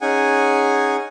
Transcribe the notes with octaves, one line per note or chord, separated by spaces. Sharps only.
C#4 D#4 G#4 F#5 G#5